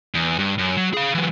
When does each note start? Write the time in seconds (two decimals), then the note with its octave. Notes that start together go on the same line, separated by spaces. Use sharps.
0.15 E2
0.39 G2
0.59 F#2
0.77 F#3
0.94 G#4 F5
1.14 E3 F#3